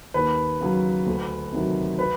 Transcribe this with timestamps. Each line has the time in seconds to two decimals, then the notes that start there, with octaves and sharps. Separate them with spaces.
0.14 D#2 B4
0.61 C#3 F#3
1.06 D2
1.53 C3 D#3 F#3
1.99 B4